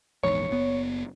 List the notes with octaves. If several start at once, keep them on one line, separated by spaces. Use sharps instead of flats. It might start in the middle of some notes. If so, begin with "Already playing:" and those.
A#1 E2 G#2 C#5
F#1 B3